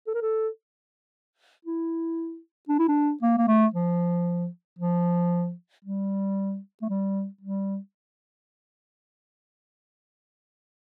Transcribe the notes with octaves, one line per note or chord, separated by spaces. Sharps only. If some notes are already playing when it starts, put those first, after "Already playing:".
A4
A#4
A4
E4
D4
E4
D4
A#3
A#3
A3
F3
F3
G3
A3
G3
G3